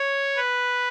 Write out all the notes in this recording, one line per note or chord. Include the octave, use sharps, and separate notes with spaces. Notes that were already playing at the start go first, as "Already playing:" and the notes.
Already playing: C#5
B4